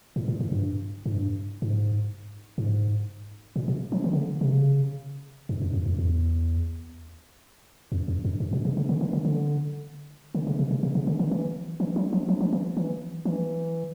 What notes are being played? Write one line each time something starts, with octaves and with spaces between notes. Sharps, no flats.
A2
A2
G#2
G2
G#2
G2
G#2
G#2
A#2
B2
F3
D#3
C#3
D3
C3
C#3
G2
F#2
F2
E2
E2
F2
F2
F#2
G2
B2
C3
C#3
D3
D#3
D3
D3
D3
C#3
C3
C3
C3
C#3
D3
D#3
E3
E3
F#3
F3
F3
F3
E3
E3
E3